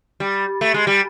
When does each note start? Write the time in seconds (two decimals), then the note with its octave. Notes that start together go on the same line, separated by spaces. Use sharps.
0.20 G3
0.61 A3
0.74 G#3
0.87 G3